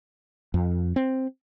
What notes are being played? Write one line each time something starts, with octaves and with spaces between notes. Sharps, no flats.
F2
C4